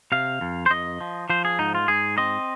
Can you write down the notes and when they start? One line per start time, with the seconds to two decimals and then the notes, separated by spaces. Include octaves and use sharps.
0.12 C3 F5
0.41 F2
0.66 C5
0.70 F2 D#5
1.01 F3
1.30 F3 C5
1.45 G#4
1.59 G#2 D#4
1.75 F4
1.88 G#2 G#4
2.18 C4 D#5